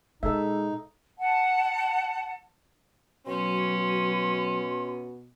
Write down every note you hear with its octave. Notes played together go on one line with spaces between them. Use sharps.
A#2 G#3 D#4 A4 E5
F#5 A5
B2 F#3 C#4 C6